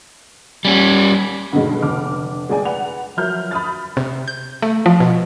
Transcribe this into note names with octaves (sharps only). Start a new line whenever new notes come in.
G3 C#4
G2 B2 D3 D#3 F#3 G#3
F1 D3 D6 F6
G#3 G#4 D5 G5 G#5
B4 F#5 F7
F3 F#3 A#4 E5 F6 G6
B5 D#6 F6 A6
C3
G6
A3
F3
B2